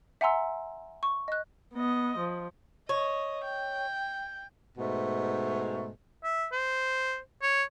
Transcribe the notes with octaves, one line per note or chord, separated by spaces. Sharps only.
E5 F#5 G#5 A#5 C6 E6
C#6
D#5 F#6
B3 D#5
F3
C#5 D#5
G5
G#2 B2 A3
E5
C5
C#5